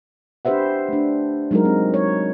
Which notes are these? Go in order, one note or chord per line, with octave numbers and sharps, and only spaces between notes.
D4 G4 B4 C5 E5 F#5
A3 D4
F#3 G#3 D#4 F#4 A#4
C4
C#5